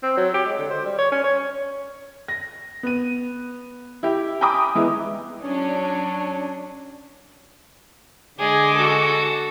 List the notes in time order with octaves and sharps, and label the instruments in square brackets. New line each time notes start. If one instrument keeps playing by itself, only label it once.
[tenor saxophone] C4
F#3
G4
G#3
D3
C5
G3
C#5
C#4
C#5
[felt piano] A#6
B3 D#7
E4 G4
G5 G#5 A#5 B5 D6 D#6
E3 G#3 B3 E4
[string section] F#3 C#4 D4
[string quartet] D3 G#3 D6 [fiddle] G#4
[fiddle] F#4 A4